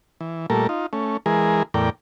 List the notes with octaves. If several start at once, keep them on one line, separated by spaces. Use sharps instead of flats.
E3
A#2 G3 A3 A4 A#4
D#4 F4
A3 C#4
E3 G#3 G#4 A#4
E2 A2 A#4 D5 G5